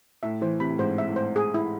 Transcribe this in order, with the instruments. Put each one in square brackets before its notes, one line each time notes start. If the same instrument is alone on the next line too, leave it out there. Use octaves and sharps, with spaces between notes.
[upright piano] A2 [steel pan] E5
[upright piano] E3 [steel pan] C5
[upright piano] C3 [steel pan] B5
[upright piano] A2
[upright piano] G#2 [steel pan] C5
[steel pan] E5
[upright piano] A2
[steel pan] C5
G#4
E4